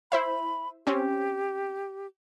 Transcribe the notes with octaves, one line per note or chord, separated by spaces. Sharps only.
E4 C5 E5 B5
C4 C#4 G4